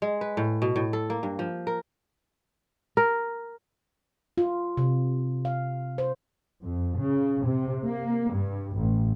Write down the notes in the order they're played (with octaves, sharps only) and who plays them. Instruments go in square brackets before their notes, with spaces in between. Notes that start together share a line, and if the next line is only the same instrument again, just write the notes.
[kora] G#3
B4
A2
B2
A2
A4
A#3
G2
F3
A#4
A#4
[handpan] F4
C3
F5
C5
[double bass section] F2
C#3
C3
A#3
G2
A1